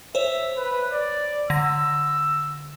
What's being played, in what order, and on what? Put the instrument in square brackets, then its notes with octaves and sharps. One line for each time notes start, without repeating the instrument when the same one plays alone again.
[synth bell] C5 C#5 [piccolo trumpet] E5
[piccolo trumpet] B4
D5
[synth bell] D3 A#6 [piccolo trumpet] E6